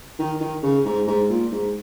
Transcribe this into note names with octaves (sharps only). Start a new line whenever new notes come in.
D#3
D#3
C#3
G#2
G#2
A#2
G#2